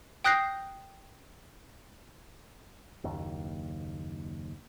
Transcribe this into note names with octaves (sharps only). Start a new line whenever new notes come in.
G5 D#6 F#6 G6 A#6 C7
F#1 D#2